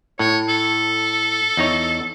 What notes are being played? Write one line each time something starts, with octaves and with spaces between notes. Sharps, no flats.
A2 C#5
A4
E2 D#4 C#5